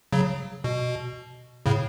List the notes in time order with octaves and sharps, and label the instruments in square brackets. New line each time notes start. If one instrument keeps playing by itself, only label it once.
[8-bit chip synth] C#3 F#3
B2
A2 C#3